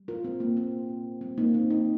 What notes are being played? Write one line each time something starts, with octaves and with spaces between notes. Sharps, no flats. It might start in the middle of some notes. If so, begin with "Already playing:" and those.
Already playing: G3
F4 A#4
A#2 C4
A#3
A#3 C4
A#2
G3 C4
A#3 D#4
D#3 C4
A#3 D#4